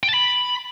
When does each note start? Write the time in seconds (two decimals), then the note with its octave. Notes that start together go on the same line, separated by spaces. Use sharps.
0.03 G5
0.09 A5
0.14 B5